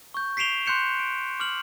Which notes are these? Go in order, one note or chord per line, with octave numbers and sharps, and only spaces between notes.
C#6 G6
B6 C7 D7 E7 F7 G7
C6 F#6 G6 C#7 E7
D7
D6 F6 F#7